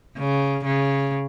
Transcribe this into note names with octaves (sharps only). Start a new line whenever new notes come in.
C#3
C#3